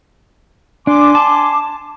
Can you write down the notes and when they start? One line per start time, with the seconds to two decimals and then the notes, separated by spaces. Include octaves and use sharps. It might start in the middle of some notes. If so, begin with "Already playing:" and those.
0.87 D4 G#5 C6 D6
1.15 A5